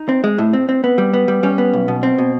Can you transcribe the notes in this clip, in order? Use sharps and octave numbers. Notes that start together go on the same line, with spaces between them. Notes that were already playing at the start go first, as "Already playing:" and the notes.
Already playing: D#4
C4
G#3
A2
C4
C4
B3
G3
B3
G3
G3 C#4
B3
B1
B2
C4
B2